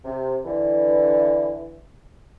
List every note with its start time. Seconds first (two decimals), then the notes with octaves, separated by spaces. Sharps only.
0.05 C3
0.44 D3 E3